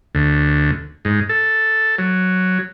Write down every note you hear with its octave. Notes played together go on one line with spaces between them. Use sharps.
D2
G#2
A4
F#3